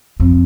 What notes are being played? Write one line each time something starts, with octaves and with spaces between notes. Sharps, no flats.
F2